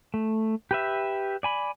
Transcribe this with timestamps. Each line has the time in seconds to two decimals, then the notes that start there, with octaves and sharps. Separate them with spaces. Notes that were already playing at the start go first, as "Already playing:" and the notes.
0.14 A3
0.71 G4 B4 E5
1.43 D5 G#5 B5